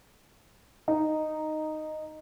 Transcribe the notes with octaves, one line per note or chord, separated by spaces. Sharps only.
D#4